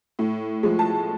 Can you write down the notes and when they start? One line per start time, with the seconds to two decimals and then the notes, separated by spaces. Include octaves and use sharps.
0.19 A2
0.63 F3 G#3
0.79 A5